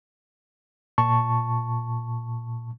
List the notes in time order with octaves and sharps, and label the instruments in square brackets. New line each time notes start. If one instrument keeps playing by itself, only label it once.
[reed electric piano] A#2 A5 C#6